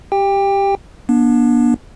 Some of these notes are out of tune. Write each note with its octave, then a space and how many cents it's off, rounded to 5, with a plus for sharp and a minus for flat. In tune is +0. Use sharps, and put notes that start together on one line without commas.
G4 +0 G5 +25
B3 -45 D4 +0